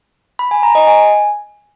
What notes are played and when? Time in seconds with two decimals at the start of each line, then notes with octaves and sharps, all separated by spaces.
0.39 B5
0.51 G#5
0.63 A#5
0.75 D#5
0.87 G#5